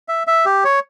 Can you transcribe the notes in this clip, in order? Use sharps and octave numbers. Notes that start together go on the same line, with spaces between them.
E5
E5
G4
C#5